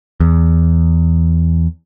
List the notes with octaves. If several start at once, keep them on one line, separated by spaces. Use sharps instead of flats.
E2